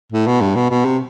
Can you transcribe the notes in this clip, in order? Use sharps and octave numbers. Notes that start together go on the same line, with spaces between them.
A2
B2
G2
B2
B2
C3